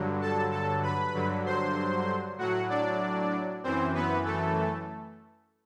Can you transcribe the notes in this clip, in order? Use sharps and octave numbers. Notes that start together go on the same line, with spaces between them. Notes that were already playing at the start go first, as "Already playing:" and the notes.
Already playing: G2 D3 F#3
A4 A5
A4 A5
B4 B5
G2 D3 F#3
C5 C6
A2 F#3 F#4 F#5
D4 D5
F#2 E3 C4 C5
B3 B4
A3 A4